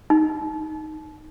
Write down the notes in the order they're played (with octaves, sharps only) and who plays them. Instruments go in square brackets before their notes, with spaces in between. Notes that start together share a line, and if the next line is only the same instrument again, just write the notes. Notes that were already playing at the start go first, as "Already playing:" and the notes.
[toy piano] D#4